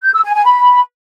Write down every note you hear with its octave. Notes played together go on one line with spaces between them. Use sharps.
G6
E6
G#5
G#5
B5